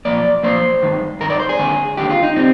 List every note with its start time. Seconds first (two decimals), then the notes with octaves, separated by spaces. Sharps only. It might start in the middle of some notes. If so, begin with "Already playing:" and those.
0.05 A#2 F3 A#3 D5
0.43 A#2 F3 A#3 C5
0.82 G2 D#3 G#3
1.20 G2 D#3 G#3 A#4
1.30 D5
1.40 C5
1.49 G#4
1.58 D#2 D3 G#3
1.97 D#2 D3 G#3 G4
2.10 F4
2.23 D#4
2.36 D3 G3 C4